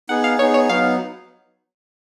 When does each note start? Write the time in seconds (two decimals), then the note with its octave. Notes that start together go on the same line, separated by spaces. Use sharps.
0.09 B3 D#4 G#4 F#5
0.24 F5
0.39 B3 D#4 G#4 C#5
0.54 C#5
0.69 F#3 B3 D#4 F5